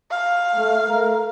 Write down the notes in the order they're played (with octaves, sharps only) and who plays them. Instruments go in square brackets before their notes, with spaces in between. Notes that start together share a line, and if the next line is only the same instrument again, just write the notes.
[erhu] F5
[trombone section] A3
A3 A#4